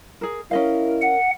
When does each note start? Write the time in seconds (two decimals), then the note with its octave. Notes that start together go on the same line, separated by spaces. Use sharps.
0.21 G#4 A#4
0.51 C#4 E4 A#4 D#5 F5
1.02 F#5